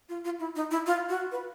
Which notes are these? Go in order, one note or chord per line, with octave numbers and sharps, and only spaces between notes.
F4
F4
E4
D#4
E4
F4
F#4
B4